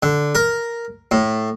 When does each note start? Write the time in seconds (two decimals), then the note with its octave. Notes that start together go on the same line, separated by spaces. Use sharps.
0.03 D3
0.35 A#4
1.11 A2